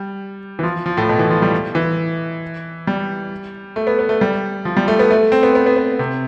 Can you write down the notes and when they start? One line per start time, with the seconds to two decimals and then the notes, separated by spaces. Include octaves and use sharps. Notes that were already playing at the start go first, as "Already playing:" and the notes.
Already playing: G3
0.59 E3
0.63 F3
0.86 F3
0.97 A2
1.09 B2
1.19 E3
1.30 F3
1.42 G3
1.75 E3
2.87 G3
3.76 A3
3.87 B3
3.99 B3
4.09 A3
4.21 G3
4.65 F3
4.77 G3
4.88 A3
4.99 B3
5.10 A3
5.32 C4
5.43 B3
5.55 B3
5.66 B3
5.76 B3
5.99 C3